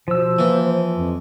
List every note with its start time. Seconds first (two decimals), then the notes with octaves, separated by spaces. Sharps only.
0.08 B2 F3 C5 E6
0.39 E3 A#3
0.95 F2